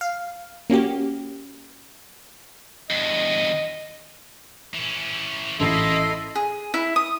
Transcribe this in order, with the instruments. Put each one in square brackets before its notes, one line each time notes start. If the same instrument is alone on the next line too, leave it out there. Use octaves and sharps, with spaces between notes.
[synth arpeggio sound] F5
A#3 C#4 F#4 G4
[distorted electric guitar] E2 G2 [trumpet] D#5
[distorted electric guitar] E3 C#4
[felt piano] A1 C7 [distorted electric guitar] A#3 [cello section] E4 D#5 [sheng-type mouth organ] A4 C6
[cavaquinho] G#4
E4
D#6